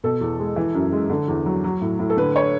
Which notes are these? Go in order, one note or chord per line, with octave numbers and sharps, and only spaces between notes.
B2 A4
E2
G#3
E3
F#2
G#3
D3
E2
F#3
F#3
A2
A2
A4
D3 B4
C#5